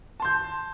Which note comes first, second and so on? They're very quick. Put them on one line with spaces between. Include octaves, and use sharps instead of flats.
A5 C6 G6